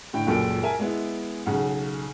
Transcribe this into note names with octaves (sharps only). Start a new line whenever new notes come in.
A2 D3 G5
C#2 F#2 A#2 A4 D7
A#4 E5 G#5 A5
G#3 B3 E4
B1 C#3 F#5